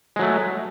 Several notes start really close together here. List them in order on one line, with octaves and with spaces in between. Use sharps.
G#3 F#3 A3